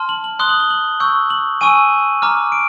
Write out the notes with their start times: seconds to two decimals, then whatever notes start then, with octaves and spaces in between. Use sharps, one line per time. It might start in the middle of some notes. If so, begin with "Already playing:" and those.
Already playing: A5 C6 F6
0.09 F#7
0.24 F#7
0.39 C6 D#6 F#6 G7
0.49 F#7
0.60 G7
0.70 F#7
1.00 C#6 E6 G6
1.30 F#7
1.61 G#5 C#6 E6 D#7
2.22 A#5 D6 F6
2.52 D7